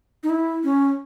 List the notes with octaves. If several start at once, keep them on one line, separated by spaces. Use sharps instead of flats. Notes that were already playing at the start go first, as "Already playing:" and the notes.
D#4
E4
C#4